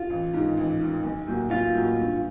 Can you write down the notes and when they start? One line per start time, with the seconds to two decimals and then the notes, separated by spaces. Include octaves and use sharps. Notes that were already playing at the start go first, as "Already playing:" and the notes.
Already playing: F4
0.10 A1
0.33 G#2 D#3
0.57 A1
0.81 G#2 D#3
1.04 B1
1.27 A2 F#3 A#3
1.51 B1 F4
1.75 A2 F#3 A#3
1.98 G2